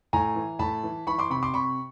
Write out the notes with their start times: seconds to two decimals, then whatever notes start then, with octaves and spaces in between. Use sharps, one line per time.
0.13 A2 G#5 A#5
0.36 E3
0.59 A2 A5 B5
0.83 E3
1.07 E3 B5 C#6
1.19 C6 D6
1.30 C3 B5 C#6
1.43 C6 D6
1.54 C3 B5 C#6